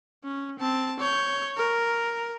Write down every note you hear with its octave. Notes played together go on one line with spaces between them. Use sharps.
C#4
C4 A5
C#5 G6
A#4